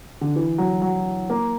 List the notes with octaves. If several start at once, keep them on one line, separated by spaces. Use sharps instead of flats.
D3
E3
F#3
F#3
A#3